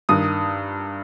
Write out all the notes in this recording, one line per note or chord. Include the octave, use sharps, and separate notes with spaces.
G2 D#3 D#6